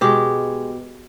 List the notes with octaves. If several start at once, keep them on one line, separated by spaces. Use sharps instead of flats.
B2 G#3 G4